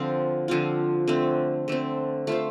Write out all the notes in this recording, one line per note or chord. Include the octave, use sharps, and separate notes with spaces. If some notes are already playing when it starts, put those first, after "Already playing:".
Already playing: D3 F3 C4 F4
D3 F3 C4 F4
D3 A3 C4
D3 A3 C4
A3 F4 C5